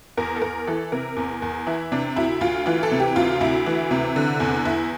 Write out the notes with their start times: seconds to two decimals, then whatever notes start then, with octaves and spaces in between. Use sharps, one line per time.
0.17 E2 A#4
0.36 A4
0.42 E2 A#4
0.67 E3 A4
0.92 C3 A#4
1.17 E2
1.42 E2
1.67 E3 E4
1.92 C3 D4
2.16 D2 E4
2.41 D2 F4
2.66 E3 F4
2.83 A4
2.91 C3
3.00 G4
3.16 D2 F4
3.41 D2 E4
3.66 E3
3.91 C3
4.16 D3
4.40 E2
4.65 E2 E4